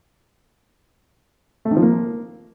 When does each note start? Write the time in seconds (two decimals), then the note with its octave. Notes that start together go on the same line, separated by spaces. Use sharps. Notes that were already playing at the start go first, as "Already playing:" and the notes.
1.65 A3
1.71 D#3
1.77 F3
1.82 A#3